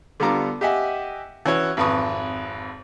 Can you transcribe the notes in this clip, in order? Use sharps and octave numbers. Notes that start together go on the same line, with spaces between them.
D3 G3 B3 F4 A#5 D6
G4 D#5 E5 F#5 G#5
E3 C#4 F#4 C#5
G#1 F2 B4 C#6 D#6